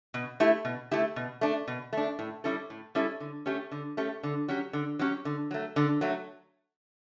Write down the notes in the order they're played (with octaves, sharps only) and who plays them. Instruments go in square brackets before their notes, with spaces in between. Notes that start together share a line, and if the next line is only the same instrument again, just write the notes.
[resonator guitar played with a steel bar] B2
A3 E4 G4
B2
A3 E4 G4
B2
A3 D4
B2
A3 D4
A2
G3 C#4 E4 A4
A2
G3 C#4 E4 A4
D3
A3 C#4 G4
D3
A3 C#4 G4
D3
F#3 C#4 G4
D3
F#3 C#4 G4
D3
F#3 A3
D3
F#3 A3